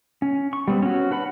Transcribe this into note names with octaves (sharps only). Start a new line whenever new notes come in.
C#4
C#6
G3 B3 C4
C#4 F#4
D4 B4 F#5 B5